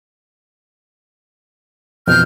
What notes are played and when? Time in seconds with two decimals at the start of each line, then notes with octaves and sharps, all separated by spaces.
2.07 F2 B2 E3 F6 G6